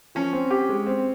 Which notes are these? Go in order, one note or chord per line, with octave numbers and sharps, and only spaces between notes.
F3 C#4
C4
G4
G#3
C4